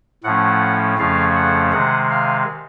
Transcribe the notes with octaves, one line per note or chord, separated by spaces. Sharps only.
A2 F3 A3 C#4 F#5
F2 C#3 F3 A3 C#4 F5
F#5
C3 D#3 G#3 F#5
F5